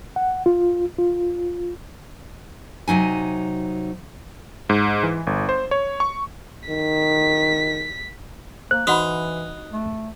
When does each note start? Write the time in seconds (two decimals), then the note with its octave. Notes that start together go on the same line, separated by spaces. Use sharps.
0.16 F#5
0.46 F4
0.98 F4
2.88 C3 F#3 D#4 G#5
4.69 G#2
5.03 E3
5.27 G1
5.49 C5
5.71 C#5
6.00 C#6
6.69 D#3 B6
8.71 A#3 C5 F#6
8.87 E3 D#4 F#4 F#5 B5
9.72 A3